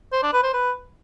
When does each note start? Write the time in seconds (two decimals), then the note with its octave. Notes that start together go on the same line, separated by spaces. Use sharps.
0.13 C5
0.23 D4
0.33 B4
0.43 C5
0.54 B4